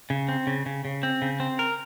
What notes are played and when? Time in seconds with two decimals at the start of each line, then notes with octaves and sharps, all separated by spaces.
0.10 C#3
0.29 C4
0.47 C#3
0.66 C#3
0.85 C#3
1.03 C4
1.22 C#3
1.40 C4
1.59 A#4